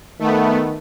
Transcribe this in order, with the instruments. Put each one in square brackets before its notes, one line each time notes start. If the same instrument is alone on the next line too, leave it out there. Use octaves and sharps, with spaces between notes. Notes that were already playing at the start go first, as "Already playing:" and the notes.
[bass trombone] D#3 [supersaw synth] A3 B3